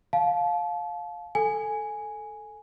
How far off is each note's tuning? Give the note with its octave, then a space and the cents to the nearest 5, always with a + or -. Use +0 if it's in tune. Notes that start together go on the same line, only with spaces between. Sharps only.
F5 +15 A5 -30
A4 +0 G#5 +0